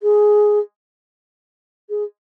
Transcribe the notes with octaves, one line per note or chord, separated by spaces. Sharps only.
G#4
G#4